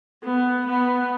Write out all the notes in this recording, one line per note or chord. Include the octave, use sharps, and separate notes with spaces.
B3
B3